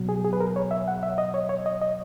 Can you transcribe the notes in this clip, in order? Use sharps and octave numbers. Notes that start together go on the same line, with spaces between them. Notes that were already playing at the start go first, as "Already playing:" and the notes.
Already playing: B2 F#3
G#4
G#4
B4
A#4
C#5
E5
F#5
E5
D#5
C#5
C#5
D#5
D#5